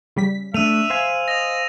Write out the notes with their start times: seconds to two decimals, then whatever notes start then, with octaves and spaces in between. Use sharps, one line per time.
0.16 C#3 G3 B6
0.54 A3 D4 E5 E6 D#7 F7
0.90 C5 F5 G#5
1.28 D#5 A#6 F7